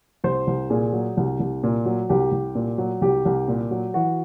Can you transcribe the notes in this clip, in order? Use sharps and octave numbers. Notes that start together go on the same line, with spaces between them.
C2 C5
C2
A#2 G#4
F#3
C2
C2
A#2
F#3
C2 G4
C2
A#2
F#3
C2 G4
C2
A#2
F#3
E3 F#4